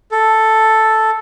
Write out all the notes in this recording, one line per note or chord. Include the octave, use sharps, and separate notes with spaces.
A4